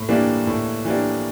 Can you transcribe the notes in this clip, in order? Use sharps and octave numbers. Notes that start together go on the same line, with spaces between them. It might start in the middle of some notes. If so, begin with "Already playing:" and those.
Already playing: A2
E3 G3 A#3 D4
A2
E3 G3 A#3 D4